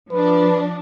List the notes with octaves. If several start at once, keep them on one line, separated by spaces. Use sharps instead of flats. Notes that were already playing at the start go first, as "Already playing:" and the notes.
F3 D4 B4